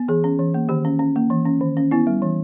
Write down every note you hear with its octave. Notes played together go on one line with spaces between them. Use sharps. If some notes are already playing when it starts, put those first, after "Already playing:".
Already playing: B3
E3 G#4
C#4
E3
A#3
D#3 G4
C#4
C#4
A#3
E3
C#4
D#3
C#4
B3 E4
G3
E3